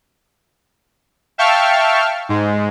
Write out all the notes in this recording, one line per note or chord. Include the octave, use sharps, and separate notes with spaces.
E5 F5 G5 A5 C#6 F6
G#2 G#3